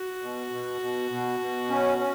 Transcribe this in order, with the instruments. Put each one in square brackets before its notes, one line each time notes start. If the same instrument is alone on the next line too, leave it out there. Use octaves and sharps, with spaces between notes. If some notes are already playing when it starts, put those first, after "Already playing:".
Already playing: [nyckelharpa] F#4
[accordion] B2
B2
B2
B2
B2
C#4
C#4